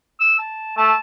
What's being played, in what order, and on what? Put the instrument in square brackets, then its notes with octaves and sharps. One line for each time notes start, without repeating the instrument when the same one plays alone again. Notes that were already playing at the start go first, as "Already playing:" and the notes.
[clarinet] E6
A5
[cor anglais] A3 [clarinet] A5